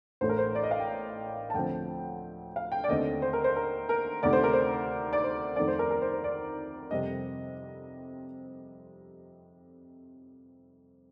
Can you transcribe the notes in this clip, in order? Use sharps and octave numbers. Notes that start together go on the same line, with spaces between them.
A1 A2 A3 C5
A#4
C5
D5
D#5
F5
G5
A5
D2 D3 F3 C4 G5
F5
G5
D5
D#2 D3 A3 C4 D#5
C5
A#4
C5
A#4
A#4
D2 C3 D#3 A3 D5
C5
A#4
C5
D5
C5
F2 D#3 A3 D5
C5
A#4
A#4
C5
C5
D5
F2 C3 G3 C4 D#5